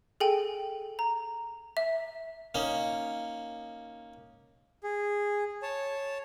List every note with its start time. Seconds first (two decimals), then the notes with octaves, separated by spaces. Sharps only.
0.20 G#4 A4 G5 G#5
0.99 A#5
1.77 E5
2.55 A#3 C#4 D#4
4.83 G#4
5.62 C#5 A5